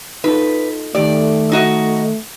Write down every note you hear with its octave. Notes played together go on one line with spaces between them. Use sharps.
D#4 F4 A4 B4
D#3 A3 G4 D5
D#4 F#4 D#5